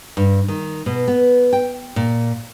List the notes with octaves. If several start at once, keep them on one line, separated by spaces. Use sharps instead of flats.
G2
D#3
B2
B3
G5
A#2